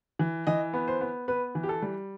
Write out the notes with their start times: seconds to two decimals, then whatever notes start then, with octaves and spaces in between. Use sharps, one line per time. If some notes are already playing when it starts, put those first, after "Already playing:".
0.19 E3
0.47 E3 D#5
0.73 B3
0.88 C5
1.01 B3
1.28 B3 B4
1.55 E3
1.63 G4
1.69 A4
1.82 G3